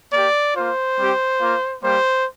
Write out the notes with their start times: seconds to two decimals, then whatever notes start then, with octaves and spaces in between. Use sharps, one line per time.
0.13 A#3 G4 D5
0.55 A#3 F4 C5
0.97 G3 C4 G4
1.40 A#3 F4
1.82 G3 A#3 G4 C5